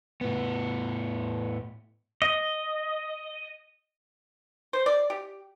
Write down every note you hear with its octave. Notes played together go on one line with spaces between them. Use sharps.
A2 B3
D#5
C5
D5
G4